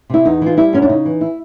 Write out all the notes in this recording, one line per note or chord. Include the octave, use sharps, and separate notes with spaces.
C3 E4
E2 D#4
E3 F4
G3 E4
F#2 C#4
D4
C#3 D#4
E3
E4